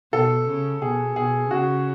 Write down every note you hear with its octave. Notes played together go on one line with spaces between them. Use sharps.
B2 A4
C#3
B2 G#4
B2 G#4
C#3 F#4